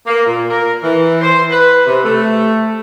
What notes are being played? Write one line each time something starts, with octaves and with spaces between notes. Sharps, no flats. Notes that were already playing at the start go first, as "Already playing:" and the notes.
A#3
A#2
A#4
E3
C5
B4
C3
A3